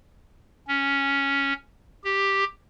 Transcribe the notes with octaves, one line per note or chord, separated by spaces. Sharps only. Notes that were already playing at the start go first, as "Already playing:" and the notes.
C#4
G4